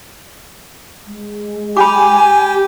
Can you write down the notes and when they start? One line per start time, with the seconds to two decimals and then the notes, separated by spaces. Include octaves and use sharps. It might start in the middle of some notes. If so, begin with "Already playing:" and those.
1.07 G#3
1.77 G4 G#5 B5 D6